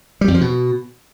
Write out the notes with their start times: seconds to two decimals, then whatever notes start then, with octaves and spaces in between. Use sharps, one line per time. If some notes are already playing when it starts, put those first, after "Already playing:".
0.21 G3
0.28 F2
0.34 F3
0.41 B2